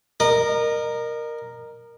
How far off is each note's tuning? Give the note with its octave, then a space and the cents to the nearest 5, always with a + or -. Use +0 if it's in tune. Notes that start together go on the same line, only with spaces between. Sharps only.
A#4 +0 D#5 -40